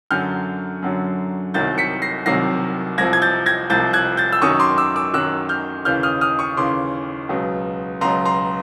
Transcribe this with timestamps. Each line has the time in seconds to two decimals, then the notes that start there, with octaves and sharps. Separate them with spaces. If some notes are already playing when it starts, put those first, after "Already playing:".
0.11 F#2 D3 F#3 F6 G6
0.82 F#2 D3 F#3
1.54 C2 C3 D#3 F#3 G6 A6
1.78 B6 C#7
2.02 A#6 C7
2.26 C2 C3 D#3 F#3 A#6 C7
2.98 C2 C3 F3 G#6 A#6
3.13 G#6
3.22 G6 A6
3.46 G#6 A#6
3.70 C2 C3 F3 G6 A6
3.93 F#6 G#6
4.17 G6 A6
4.33 E6
4.42 F#2 D#3 F#3 C#6 D#6
4.59 C6 D6
4.78 D6 E6
4.96 D6 E6
5.14 F#2 D#3 F#3 E6 F#6
5.49 F6 G6
5.85 D#2 C#3 E3 F6 G6
6.03 D#6 F6
6.21 D#6 F6
6.39 C#6 D#6
6.57 D#2 C#3 E3 C6 D6
7.29 C#2 B2 F#3
8.01 C#2 B2 F#3 A#5 C6
8.25 A#5 C6